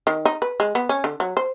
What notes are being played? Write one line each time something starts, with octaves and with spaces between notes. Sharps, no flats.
D#3
D#4
B4
G#3
B3
C#4
D3
F#3
C5